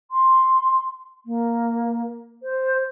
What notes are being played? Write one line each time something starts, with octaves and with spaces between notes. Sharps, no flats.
C6
A#3
C5